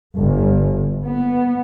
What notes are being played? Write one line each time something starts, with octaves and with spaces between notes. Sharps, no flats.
G1
B3